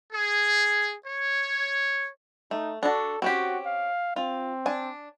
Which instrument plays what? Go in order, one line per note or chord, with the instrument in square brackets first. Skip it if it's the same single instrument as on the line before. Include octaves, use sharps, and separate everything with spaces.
[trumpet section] G#4
C#5
[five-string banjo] A3 [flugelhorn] D#4
[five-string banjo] D4 F#4 [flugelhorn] A4
[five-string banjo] C4 C#4 G4 [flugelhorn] F#4
[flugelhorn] F5
[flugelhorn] C4 [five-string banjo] F4
[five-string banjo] D4 G#5